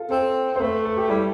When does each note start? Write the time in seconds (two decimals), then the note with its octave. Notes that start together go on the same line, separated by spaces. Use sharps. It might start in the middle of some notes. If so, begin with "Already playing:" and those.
Already playing: F4 A4
0.11 C4 A4
0.56 C5
0.60 A3 B4
0.85 A4
0.97 G4
1.10 G3 E4